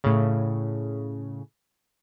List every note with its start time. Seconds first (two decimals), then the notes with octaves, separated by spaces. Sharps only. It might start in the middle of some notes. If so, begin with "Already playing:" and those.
0.04 A2 C#3